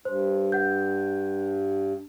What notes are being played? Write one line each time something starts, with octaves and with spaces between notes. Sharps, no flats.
G2 C5
F#5 G6